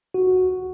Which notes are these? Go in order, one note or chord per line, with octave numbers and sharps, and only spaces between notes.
F#4